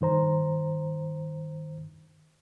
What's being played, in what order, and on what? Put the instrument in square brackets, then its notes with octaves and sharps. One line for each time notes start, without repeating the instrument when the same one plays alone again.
[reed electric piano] G2 D#3 C5 A#5